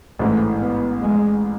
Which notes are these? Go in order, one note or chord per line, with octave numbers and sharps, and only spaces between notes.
A1 G#2 E3 A3
B3
G#3